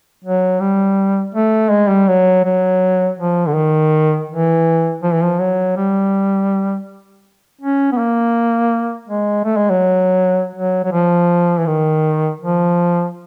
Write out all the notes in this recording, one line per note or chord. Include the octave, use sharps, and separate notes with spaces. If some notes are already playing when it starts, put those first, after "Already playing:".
F#3
G3
A3
G#3
G3
F#3
F#3
F3
D3
D#3
E3
F3
E3
F3
F#3
G3
C#4
B3
A#3
G#3
A3
G#3
F#3
F#3
F#3
F3
E3
D#3
F3